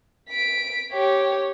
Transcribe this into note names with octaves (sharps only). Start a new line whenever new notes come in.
B6 D7
G4 C#5